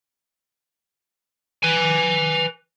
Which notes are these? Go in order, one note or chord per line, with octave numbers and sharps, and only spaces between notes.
B4 G#5